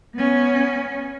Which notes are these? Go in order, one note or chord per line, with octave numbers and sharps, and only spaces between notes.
B3 C#4